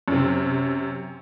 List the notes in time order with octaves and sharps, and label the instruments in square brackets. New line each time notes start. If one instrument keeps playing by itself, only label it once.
[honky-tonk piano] F#2 C3